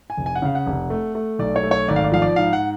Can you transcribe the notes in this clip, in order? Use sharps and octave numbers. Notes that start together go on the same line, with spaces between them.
G#5
F1
G#5
F#5
C#3 F5
F#5
F1
A3
A3
B1 D5
C#5
A3
C#5
G#1 D5
F5
D5
F3 F5
D5
G#2 F5
F#5